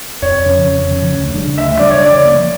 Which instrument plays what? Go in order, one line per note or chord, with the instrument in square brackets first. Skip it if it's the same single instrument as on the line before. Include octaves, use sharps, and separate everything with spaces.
[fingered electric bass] F2 [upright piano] C#5
[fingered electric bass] C#3 F3 C#4
F2
C#3 F3 C#4
D2
C#3 G3 D4
[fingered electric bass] D2 [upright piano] E5
[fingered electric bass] C#3 G3 D4 [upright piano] D5
[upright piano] C#5
[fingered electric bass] C#3 [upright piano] D5
[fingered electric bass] F3 A#3